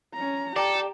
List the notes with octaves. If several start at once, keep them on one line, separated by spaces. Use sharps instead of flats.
C#4 A#5
G4 A4 D5 G5 A#5